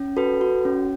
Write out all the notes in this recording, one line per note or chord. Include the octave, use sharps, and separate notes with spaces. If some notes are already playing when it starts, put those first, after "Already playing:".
Already playing: C#4
F#4 A4 B4
F#4
C#4